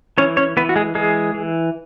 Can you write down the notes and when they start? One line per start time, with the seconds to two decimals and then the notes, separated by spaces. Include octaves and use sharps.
0.18 E3 C#4 C#5
0.37 C#4 C#5
0.57 E3 B3 B4
0.69 F#4
0.76 G#3 G#4
0.95 E3 G#3 G#4
1.34 E3